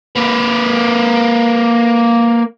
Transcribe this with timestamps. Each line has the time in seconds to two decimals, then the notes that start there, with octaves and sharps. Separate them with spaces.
0.16 A#3 B4